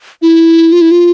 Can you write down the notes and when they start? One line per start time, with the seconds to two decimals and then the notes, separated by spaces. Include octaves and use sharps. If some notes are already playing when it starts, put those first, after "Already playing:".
0.22 E4
0.72 F4
0.81 E4
0.91 F4